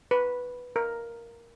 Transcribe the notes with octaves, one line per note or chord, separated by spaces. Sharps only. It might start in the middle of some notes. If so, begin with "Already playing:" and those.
B4
A#4